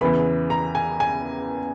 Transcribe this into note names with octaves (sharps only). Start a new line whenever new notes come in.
E2 C#3 E3 B3 B5
A#5
G#5
G#5